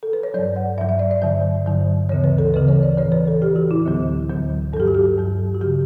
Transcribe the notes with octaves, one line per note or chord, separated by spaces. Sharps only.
A4
B4
C#5
G2 F#3 D5
F#5
G2 F#3 E5
E5
D5
D5
G2 D3 F#3 E5
G2 D3 F#3
D2 C#3 E3 C#5
B4
A4
D2 C#3 E3 B4
C#5
D5
A2 E3 C#5
B4
A4
A2 E3 G4
F#4
E4
D2 D3 F#3
D2 D3 F#3
G2 F#3 G4 A4
F#4
G4
G2 F#3
F#4
C#3 F#3 G4